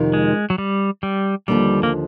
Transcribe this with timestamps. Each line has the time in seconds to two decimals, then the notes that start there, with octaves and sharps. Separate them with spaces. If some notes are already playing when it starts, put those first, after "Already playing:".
Already playing: F2 C3 D#3
0.13 G#3
0.50 F#3
0.58 G3
1.03 G3
1.48 D#2 D3 F3 G3
1.83 A#3